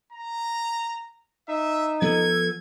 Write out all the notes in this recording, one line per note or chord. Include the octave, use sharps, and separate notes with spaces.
A#5
D#4 E5
F3 B3 A4 G#6